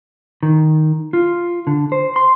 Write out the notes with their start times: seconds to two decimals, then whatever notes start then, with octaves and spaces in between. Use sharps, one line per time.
0.43 D#3
1.13 F4
1.67 D3
1.92 C5
2.16 C6